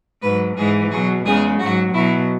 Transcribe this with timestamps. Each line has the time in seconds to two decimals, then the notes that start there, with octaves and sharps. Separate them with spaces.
0.23 G#2 F#3 B4
0.57 G#2 E3 G#3 G#4
0.92 B2 F#3 G#4
1.26 E2 C#3 G#3 G#4
1.60 G#2 F#3 F#4
1.94 B2 F#3 E4